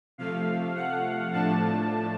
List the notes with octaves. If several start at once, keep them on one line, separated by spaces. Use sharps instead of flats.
C3 F3 A3 F5
F#5
A2 F3 A3 D4 A5